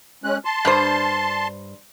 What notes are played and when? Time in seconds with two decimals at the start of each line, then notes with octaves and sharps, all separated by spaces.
0.24 G#3 C#4 F#6
0.45 A5 C6
0.65 G2 C5